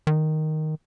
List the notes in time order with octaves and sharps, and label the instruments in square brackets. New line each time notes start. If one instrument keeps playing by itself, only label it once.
[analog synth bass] D#3